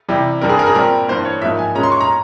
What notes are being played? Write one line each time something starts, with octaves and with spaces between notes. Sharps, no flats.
C3 E3 G3
G2 G3 C4 A#4
G#4
A#4
G#4
A#2 G3 C4 A#4
G2 E3 A#3 C5
C#5
G#2 F3 A#3 E5
G#5
A#2 G#3 C#4 A#5
C6
C#6
A#5